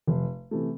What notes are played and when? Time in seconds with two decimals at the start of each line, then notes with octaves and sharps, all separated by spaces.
0.07 F1
0.51 C3 E3 A3